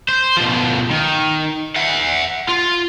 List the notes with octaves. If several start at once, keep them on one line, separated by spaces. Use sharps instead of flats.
C5
B2 F3
D#3
E5 F#5
F4